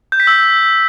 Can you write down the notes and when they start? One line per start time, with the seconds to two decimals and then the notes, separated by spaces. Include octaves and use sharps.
0.12 G6
0.20 B6
0.27 E6